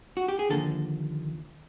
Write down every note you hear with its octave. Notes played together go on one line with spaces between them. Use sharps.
F#4
G4
G#4
D#2 D3 F3 A#3 A4